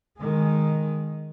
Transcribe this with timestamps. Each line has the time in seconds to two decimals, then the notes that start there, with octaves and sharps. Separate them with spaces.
0.18 D#3 G#3